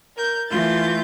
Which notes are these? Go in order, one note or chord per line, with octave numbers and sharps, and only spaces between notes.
A#4 G6
E3 A3 F4 G6 A6